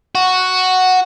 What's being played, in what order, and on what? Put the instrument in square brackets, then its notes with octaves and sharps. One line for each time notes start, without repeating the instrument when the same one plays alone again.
[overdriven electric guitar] F#4